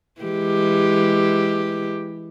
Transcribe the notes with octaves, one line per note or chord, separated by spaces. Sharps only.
E3 G#3 G4